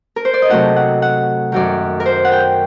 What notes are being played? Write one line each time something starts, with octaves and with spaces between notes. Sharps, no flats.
A#4
C5
D5
D#5
C3 F#3 A3 D#4 F#5
F#5
F#5
F#2 D#3 F#3 D5
A#4
C5
F#5
G5